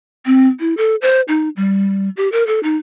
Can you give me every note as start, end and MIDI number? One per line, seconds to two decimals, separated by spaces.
0.26 0.48 60
0.60 0.76 64
0.77 0.96 69
1.02 1.21 72
1.28 1.49 63
1.56 2.09 55
2.17 2.31 67
2.32 2.46 70
2.47 2.60 69
2.63 2.77 63